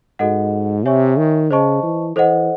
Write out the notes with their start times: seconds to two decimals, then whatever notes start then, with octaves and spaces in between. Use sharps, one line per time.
0.19 G#2 F#4 A4 D#5 F#5
0.85 C3 C#5 E5 G#5 C#6
1.18 D#3
1.51 C#3 C5 D#5 A5 C#6
1.83 E3
2.16 E3 A4 C5 D#5 F#5